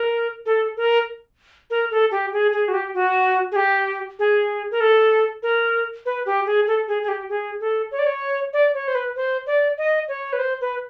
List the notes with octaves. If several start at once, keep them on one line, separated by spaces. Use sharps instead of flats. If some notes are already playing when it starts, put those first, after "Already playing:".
Already playing: A#4
A4
A#4
A#4
A4
G4
G#4
G#4
F#4
G4
F#4
G#4
G4
G#4
A#4
A4
A#4
B4
G4
G#4
A4
G#4
G#4
G4
G#4
A4
C#5
D5
C#5
D5
C#5
C5
B4
C5
D5
D#5
C#5
B4
C5
B4